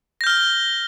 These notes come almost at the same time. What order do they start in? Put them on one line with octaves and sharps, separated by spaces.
A#6 G6 F6 G7